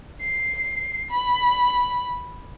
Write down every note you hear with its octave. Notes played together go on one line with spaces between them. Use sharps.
C7
B5